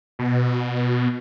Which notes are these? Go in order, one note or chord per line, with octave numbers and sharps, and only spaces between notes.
B2